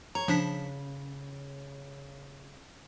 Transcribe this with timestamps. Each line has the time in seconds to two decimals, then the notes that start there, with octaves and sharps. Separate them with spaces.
0.15 C#5 A#5
0.28 C#3 F3 D4 B6